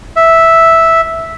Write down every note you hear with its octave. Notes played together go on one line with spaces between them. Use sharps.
E5